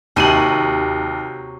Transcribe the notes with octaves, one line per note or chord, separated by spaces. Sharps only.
D#2 C3 F#3 C6 D#7 F#7